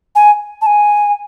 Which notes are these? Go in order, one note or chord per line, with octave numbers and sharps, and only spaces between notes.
G#5
A5
G#5